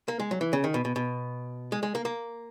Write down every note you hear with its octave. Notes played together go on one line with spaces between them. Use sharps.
A#3
G#3
F#3
E3
C#3
D#3
B2
B2
B2
G#3
G#3
A#3
A#3